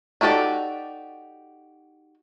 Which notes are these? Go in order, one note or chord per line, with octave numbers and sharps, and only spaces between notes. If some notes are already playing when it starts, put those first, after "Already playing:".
D#4 F#4 G4 A4 D5